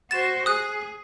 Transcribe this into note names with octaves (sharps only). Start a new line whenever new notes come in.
F#4 C5 A6 E7
G#4 D#6 F#6